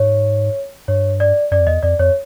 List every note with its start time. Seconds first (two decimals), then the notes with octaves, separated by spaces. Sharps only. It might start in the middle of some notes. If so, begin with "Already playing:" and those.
Already playing: G#2 C#5
0.88 G2 C#5
1.20 D5
1.51 F#2 D5
1.60 F2
1.67 E2 D#5
1.83 F2 D5
1.99 F2 C#5